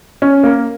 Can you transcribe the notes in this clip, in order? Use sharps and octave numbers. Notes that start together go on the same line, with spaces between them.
C#4
A#3